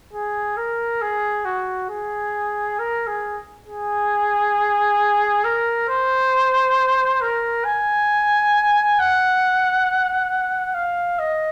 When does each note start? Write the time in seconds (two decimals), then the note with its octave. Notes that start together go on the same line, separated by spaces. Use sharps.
0.13 G#4
0.57 A#4
1.02 G#4
1.45 F#4
1.89 G#4
2.79 A#4
3.07 G#4
3.66 G#4
5.45 A#4
5.89 C5
7.22 A#4
7.65 G#5
8.99 F#5
10.74 F5
11.19 D#5